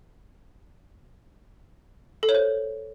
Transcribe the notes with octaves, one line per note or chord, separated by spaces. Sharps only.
A4
C#5
C5